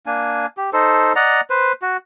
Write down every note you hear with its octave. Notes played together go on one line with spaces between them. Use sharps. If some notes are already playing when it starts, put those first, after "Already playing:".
A#3 D4 G#5
G4
D#4 A4 C5
D5 D#5 F#5 A#5
B4 C5
F#4